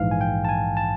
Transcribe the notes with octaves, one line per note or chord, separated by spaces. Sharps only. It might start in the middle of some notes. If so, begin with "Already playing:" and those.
Already playing: A#1 G#2 E3 F5
G#5
G5
A5
G#5
A5